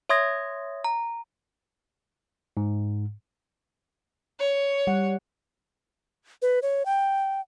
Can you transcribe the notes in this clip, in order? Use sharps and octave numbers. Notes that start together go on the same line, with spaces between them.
C#5 E5 C6 D#6 G#6 A#6
A#5
G#2
C#5
G3 F#5
B4
C#5
G5